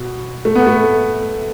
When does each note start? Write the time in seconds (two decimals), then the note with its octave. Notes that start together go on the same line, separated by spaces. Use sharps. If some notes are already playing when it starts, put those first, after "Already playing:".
Already playing: B2
0.45 A3
0.55 B3
0.67 A3